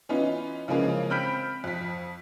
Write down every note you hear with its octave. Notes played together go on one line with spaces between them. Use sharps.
E3 B3 C#4 D#4 F4
C#3 E3 F3 G#3 A#3 C#4
C4 B5 F6 G6 B6 D7
F2 B6